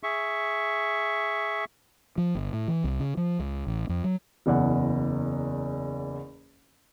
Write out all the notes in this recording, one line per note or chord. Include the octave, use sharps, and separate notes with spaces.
G#4 E5 C#6
F3
G1
A2
E3
C2
C#3
F3
C#2
A1
F2
F#3
F#1 E2 F#5